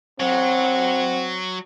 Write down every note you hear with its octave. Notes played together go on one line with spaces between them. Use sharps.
F#3 C4 F#5